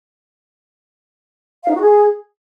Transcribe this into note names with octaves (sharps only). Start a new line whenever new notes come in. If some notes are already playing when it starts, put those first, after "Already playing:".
F5
D#4
F#4
G#4